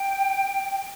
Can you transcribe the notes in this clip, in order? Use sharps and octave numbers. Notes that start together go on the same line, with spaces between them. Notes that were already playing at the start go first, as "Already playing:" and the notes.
Already playing: G5